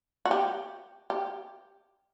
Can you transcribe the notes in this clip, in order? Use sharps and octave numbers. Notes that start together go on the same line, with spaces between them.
F#4
G4
G4